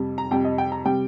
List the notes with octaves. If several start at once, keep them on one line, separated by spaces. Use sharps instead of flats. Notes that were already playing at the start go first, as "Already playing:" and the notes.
Already playing: F2 C3 G3
A#5
F2 C3 G3 G5
D#5
G5
A#5
C3 G3 G5